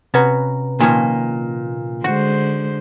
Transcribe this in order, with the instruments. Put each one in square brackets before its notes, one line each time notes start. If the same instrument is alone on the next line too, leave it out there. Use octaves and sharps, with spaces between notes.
[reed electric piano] C3 B4 A#5 [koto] B3 C#4 F#4
[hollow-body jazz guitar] A#2 [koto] D#3 F3 C#4
[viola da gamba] D3 G#3 C5 [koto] F#4